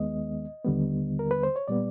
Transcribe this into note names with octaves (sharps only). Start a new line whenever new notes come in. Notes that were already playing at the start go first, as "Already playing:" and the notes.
Already playing: D#2 D#3 G#3 B3 D#5
D#2 D3 G3 B3
A#4
B4
C5
C#5
A#2 G3 B3 D5